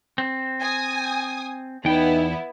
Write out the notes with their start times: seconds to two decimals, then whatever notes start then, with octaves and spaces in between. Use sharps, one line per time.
0.18 C4
0.60 G#5 D#6
1.85 E2 B3 D#4 E4 G5